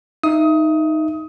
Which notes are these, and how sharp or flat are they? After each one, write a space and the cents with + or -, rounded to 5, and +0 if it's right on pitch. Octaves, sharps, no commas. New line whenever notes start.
D#4 +0 E5 +15 D#6 +20